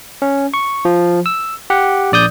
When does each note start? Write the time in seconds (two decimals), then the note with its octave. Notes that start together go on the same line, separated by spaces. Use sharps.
0.22 C#4
0.54 C#6
0.85 F3
1.26 E6
1.70 G4 F#5
2.12 A#1 D5 D#6 G6